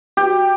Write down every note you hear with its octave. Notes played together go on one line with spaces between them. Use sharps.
G4